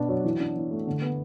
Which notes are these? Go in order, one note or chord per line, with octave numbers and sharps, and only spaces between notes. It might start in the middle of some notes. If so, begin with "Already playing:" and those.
Already playing: B2 B3 D4
F#3
E3
D4
E3
A3
D3
B3